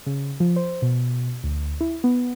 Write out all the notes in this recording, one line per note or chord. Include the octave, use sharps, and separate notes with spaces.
C#3
F3
C5
B2
D2
E4
B3